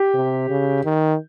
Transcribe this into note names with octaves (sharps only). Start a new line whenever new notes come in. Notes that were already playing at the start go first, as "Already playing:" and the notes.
Already playing: G4
C3
C#3
D#3